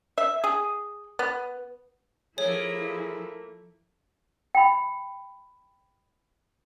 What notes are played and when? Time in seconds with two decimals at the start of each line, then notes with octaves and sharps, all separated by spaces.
0.18 E5
0.44 G#4
1.19 B3
2.38 F3 A3 A#3 E4 G#4 C#5
4.55 G5 B5